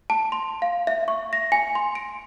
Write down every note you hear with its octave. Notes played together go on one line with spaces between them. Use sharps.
A5
C6
F5
E5
C#6
A#6
G#5
C6
D7